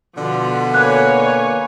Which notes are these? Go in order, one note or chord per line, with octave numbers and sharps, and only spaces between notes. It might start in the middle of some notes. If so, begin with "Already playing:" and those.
B2 D3 F3
A#3 B4 C#5 G#5 F#6